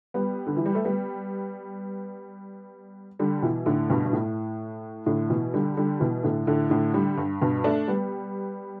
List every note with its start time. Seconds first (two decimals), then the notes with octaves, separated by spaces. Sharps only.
0.14 G3 B3
0.47 D3
0.56 E3
0.66 G3
0.75 A3
0.84 G3 B3
3.19 D3 G3
3.42 B2 E3
3.66 A2 D3
3.90 G2 B2
4.05 G2
4.13 A2
5.06 A2 D3
5.30 B2 E3
5.54 D3 G3
5.77 D3 G3
6.00 B2 E3
6.23 A2 D3
6.47 A2 D3
6.70 A2 D3
6.94 D3 G3
7.17 G2
7.41 G2 B2
7.64 A3 D4
7.88 G3 B3